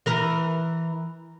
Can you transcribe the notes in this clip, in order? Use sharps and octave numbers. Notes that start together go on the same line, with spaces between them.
E3 A#4